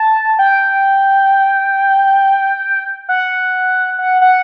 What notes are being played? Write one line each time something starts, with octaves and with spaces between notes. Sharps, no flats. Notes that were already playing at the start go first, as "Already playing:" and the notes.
Already playing: A5
G5
F#5
F#5
F#5